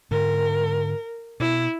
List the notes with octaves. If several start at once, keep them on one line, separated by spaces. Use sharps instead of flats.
G#2 D3 A#4
B2 E4